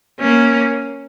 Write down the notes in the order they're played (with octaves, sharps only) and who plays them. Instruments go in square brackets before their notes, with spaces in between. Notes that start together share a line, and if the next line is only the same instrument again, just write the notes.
[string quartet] A#3 C#4